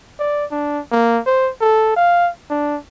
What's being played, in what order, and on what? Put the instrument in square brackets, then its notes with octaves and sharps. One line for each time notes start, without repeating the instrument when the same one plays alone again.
[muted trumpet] D5
D4
A#3
C5
A4
F5
D4